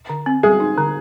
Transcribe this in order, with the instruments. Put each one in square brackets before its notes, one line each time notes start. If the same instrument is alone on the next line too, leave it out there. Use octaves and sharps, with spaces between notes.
[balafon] D3
C4
[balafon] G3 [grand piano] G#4
[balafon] D#4
D3